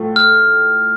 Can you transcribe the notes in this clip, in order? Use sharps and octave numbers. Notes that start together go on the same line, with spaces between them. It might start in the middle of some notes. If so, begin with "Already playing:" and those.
Already playing: A2 F3 A3
F6